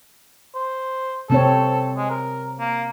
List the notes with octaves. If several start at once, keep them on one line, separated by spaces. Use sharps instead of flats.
C5
C3 C4 A4 C#5
G#3
A#4
A#3